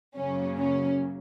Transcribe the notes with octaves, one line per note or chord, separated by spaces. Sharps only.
F#2 C#3 F#3 A#3 C#4
C#4